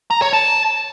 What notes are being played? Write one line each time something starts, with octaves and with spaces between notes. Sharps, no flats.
A#5
C#5
A5